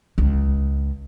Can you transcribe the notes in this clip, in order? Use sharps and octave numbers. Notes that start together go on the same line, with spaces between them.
C#2